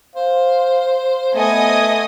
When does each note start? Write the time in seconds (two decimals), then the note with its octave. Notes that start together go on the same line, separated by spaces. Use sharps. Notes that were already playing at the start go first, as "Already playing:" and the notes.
0.16 C5 F5
1.35 A3 B3 D#5 G#5 D#6